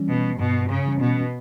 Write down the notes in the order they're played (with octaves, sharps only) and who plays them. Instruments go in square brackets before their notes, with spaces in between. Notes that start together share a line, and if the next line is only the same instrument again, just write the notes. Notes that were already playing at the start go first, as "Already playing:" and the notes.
Already playing: [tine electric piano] E3 G3 C#4
[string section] B2
[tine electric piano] G2 [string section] B2
[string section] C#3
[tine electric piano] E3 G3 C#4
[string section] B2